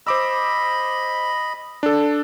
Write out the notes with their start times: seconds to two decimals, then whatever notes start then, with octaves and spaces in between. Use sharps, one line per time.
0.07 C5 D#5 B5 D6 E6
1.83 D4 A4